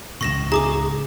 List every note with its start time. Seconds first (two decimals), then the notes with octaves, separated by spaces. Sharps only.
0.21 C#2 A2 C#6 A#6 E7
0.52 G#4 A#5 D6 D#6